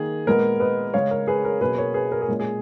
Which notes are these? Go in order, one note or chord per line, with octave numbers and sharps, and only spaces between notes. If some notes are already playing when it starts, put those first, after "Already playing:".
Already playing: D#3 A#3 G#4
A#2 G#3 B3 A#4
B4 D#5
C#3 G#3 C#4 C#5 F5
A#4
G#4 B4
A#4
B2 F#3 A#3 C#4 G#4 B4
A#4 C#5
G#4 B4
A#4
G#4
A#2 G#3 C#4
G#4